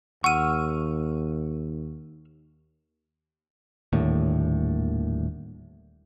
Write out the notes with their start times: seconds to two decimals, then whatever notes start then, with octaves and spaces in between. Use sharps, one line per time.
0.24 D#2 F#5 C#6 E6 F6 D#7
3.93 D#1 D#2 A2 D3